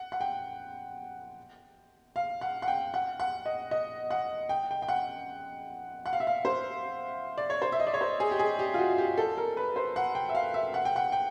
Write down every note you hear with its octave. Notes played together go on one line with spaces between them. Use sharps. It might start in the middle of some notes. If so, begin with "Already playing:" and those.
Already playing: F#5
F#5
G5
F5
F#5
F#5
G5
F#5
F#5
D#5
D#5
F#5
G5
G5
G5
F#5
F#5
F5
E5
F5
C5
D5
C#5
C5
E5
D#5
D5
C#5
C5
G#4
G4
G#4
G4
F4
F#4
G4
A4
A#4
B4
C5
F#5
G5
E5
F5
E5
F#5
G5
F#5
G5